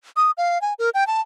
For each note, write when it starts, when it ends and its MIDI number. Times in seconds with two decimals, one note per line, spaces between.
0.16 0.31 87
0.38 0.61 77
0.61 0.74 80
0.79 0.90 70
0.94 1.07 79
1.07 1.21 81